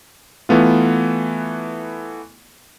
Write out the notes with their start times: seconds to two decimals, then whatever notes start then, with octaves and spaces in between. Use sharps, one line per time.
0.49 E3 A3 B3 F4